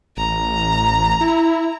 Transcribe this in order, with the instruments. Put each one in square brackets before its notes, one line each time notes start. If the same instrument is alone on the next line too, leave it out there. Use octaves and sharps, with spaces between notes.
[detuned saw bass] A1 [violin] A#5
[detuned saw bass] E4